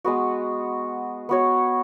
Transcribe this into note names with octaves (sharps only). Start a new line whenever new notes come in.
G#3 B3 F#4
B3 F#4 C#5